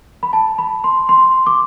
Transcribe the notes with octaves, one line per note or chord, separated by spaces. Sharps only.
B5
A5
B5
C6
C6
D6